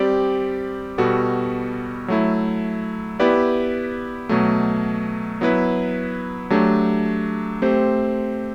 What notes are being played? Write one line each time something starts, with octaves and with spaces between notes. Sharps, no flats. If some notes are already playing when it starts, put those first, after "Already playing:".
Already playing: G3 C4 G4 D5
B2 G3 B3 F#4 A4
F#3 A3 E4
B3 E4 G4 B4 D5
B2 F#3 A3
F#3 B3 E4 B4
F#3 A3 D4 G4
A3 C4 G4 C5